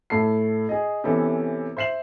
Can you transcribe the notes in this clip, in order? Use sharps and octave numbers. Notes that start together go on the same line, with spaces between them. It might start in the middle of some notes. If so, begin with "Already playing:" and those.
A2 A3 A4 A5 C7
G#4 D#5
C3 E3 B3 C#4 A4
C5 E5 C7 E7 F#7